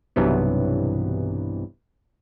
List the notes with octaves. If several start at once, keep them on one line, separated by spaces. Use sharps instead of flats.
B1 G2 C3 E3 F#3 B3